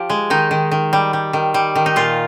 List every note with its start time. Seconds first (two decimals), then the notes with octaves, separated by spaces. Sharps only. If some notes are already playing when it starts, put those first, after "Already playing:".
Already playing: F3 G4
0.10 G#3
0.30 D#3 D#4
0.51 D#3
0.71 D#3
0.93 G3
1.13 G3
1.33 D#3
1.54 G3
1.75 D#3
1.86 D#4
1.96 A#2 F4